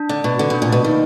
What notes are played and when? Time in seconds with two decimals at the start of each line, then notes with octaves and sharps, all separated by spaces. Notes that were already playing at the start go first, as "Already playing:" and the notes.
Already playing: D4
0.09 D3 D5
0.24 B2 F#4
0.39 D3 F#5
0.50 B2 D4
0.62 A#2
0.69 B2 D5
0.84 D#3 A#3